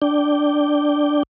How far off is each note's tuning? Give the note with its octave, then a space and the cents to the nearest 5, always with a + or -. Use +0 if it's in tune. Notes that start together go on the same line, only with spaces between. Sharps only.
D4 +0 G5 +0